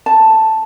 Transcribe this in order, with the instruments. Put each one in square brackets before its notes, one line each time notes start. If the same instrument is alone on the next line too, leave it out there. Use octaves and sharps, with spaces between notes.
[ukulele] A5